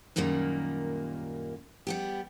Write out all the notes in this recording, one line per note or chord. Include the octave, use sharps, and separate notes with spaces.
F#2 A#2 D#3 G3 A#3
G3 B3 G4